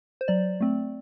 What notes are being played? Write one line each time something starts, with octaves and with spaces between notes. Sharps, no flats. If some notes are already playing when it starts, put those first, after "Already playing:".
C5
F#3 D5
A3 C4